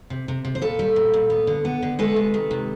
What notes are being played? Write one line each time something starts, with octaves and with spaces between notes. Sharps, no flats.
C3
C3
C3
C5
A#2 A4 B4
G3
A#2
A#2
B3
D3
B3
D3
G#3 A4 B4
C3
D#3
C3